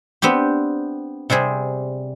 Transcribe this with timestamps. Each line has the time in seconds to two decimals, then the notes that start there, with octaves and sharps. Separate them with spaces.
0.22 B3 C4 D4 G4
1.30 C3 G3 C4 G#4